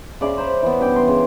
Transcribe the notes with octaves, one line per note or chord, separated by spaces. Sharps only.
C#3 D5 E5 C6
C5 A#5 B5
E3 B3
G2 C#4 G5 D6
C6
C#3